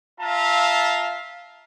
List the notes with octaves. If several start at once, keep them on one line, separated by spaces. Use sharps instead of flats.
F4 E5 F5 A5 A#5